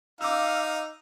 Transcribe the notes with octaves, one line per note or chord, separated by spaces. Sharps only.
D#4 F5 D6 E6